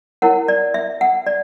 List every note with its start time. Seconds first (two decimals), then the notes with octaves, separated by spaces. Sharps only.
0.22 E4 A#4 C#5 F#5
0.48 D5
0.74 E5
1.01 F#5
1.26 D5